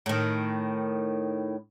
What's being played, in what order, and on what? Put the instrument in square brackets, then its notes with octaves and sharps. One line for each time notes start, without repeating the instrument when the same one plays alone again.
[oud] A2 D#3